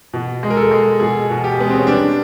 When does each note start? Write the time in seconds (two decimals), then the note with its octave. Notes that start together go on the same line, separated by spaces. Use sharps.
0.13 B2
0.43 G#3
0.50 A#4
0.57 A4
0.71 G#3
1.00 B2 G#4
1.30 B2
1.44 G4
1.59 G#3 B3
1.69 C4
1.79 C#4
1.87 G3 D4